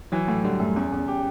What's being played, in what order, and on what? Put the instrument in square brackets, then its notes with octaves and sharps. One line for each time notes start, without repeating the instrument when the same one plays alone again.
[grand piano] E3 [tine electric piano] F#3
[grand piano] A2
[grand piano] D3 [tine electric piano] G3
[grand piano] F#2 [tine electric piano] A3
[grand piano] E2 [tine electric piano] C#4
[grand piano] E2
G4